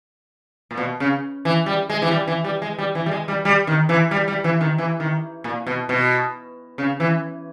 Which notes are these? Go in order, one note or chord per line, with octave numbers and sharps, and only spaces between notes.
A#2
B2
C#3
E3
G3
G#3
E3
G3
E3
G3
G#3
G3
E3
G3
G#3
G3
G3
D#3
E3
G3
G3
E3
D#3
E3
D#3
A#2
B2
B2
C#3
E3